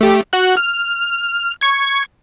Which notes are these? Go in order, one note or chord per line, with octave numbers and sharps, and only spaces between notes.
A3 G4
F#4 F#6
F6
C#6 G#6